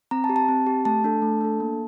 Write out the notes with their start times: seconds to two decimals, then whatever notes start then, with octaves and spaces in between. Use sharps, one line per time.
0.11 C4 A#5
0.24 A5
0.29 G4
0.36 A5
0.49 C4
0.67 G4
0.85 A3 A5
1.04 D4 A4
1.22 A3
1.41 D4 A4
1.60 A#3